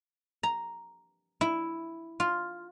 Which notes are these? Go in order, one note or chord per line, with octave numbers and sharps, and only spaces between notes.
A#5
E4
F4